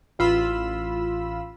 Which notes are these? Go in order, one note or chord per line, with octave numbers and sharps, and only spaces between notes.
A1 F4 B5 E6